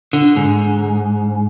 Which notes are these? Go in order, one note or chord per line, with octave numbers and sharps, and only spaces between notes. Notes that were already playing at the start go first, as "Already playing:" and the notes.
D3
G#2